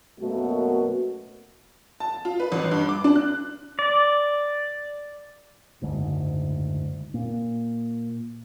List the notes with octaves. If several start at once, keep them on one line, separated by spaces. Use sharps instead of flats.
F#2 B2 A3 A#3 F#4
A5
F4
B4
A1
G2
D6
D4
F#6
D5
F#1 D2 G#2
A#2